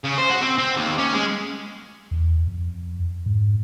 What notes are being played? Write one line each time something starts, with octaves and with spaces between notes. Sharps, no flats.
C#3
C5
F#4
C4
C4
D#2
C#4
G#3
E2
F2
G#2